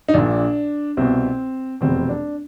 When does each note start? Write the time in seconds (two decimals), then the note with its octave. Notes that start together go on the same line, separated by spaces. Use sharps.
0.08 D#4
0.14 A#1 A#2 D4
0.97 C2 B2 C4
1.81 F1 E2 B2 C4
2.09 D4